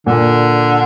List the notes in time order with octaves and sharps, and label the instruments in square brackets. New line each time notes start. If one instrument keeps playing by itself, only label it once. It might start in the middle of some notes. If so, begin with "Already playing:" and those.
[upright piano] A#2 [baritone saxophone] D3